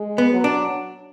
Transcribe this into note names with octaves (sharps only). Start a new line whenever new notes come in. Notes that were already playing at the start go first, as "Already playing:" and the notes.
Already playing: G#3
B3
F#3
D4